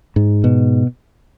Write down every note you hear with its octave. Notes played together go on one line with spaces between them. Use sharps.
G#2
B2